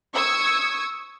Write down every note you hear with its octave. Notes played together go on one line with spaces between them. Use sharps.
C#6 D#6 E6 G#6